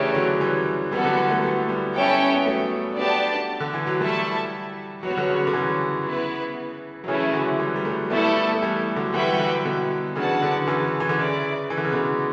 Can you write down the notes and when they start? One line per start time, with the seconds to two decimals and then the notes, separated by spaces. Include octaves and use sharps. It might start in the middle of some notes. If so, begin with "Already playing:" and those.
Already playing: C#3 E3 A3 D4 G4 C#5
0.14 D3 F#3
0.40 E3 G3
0.92 E3 G3 B3 F#4 A4
1.04 D3 F#3
1.17 E3 G3
1.30 F#3 A3
1.43 G3 B3
1.68 G3 B3
1.95 C#4 E4 A4 C#5 G5
2.34 B3
2.46 F#3 A3
2.97 B3 D4 G4 D5 A5
3.60 D3
3.74 E3
3.87 F#3
4.00 E3 G3 A3 E4 A4 E5 A5
5.03 F#3 B3 F#4 C#5
5.10 G3
5.17 D3 F#3
5.28 C#3
5.47 D3
5.53 C#3 E3
6.05 B3 E4 B4
7.04 F#3
7.08 C#3 E3 A3 C#4 E4
7.34 D3 F#3
7.59 E3 G3
7.76 G3
7.85 F#3 A3
8.10 G3 A3 B3 E4 A4
8.54 A3
8.62 E3 G3
8.96 D3 F#3
9.13 E3 G3 F#4 B4 E5 G5
9.32 G3
9.39 D3 F#3
9.65 B2 D3
10.16 C#3 E3 D4 F#4 B4 F#5 A5
10.41 D3 F#3
10.67 C#3 E3
11.00 E3
11.09 D3
11.19 C#3 E4 B4 D5
11.70 E3
11.77 D3
11.85 C#3
11.93 B2 D3